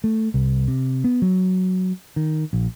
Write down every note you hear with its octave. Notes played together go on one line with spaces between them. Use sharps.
A3
C2
C3
B3
F#3
D#3
A#1